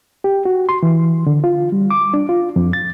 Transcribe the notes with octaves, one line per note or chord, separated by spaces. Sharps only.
G4
F#4
C6
E3
D3
F4
G3
D6
D4
F4
F2
A6